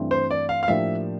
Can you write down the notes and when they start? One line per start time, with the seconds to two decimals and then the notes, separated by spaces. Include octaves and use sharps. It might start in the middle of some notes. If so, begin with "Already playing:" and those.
Already playing: G2 E3 A3 C4
0.11 C5
0.31 D5
0.49 F5
0.63 F5
0.68 A2 F3 A#3 D4 G4 E5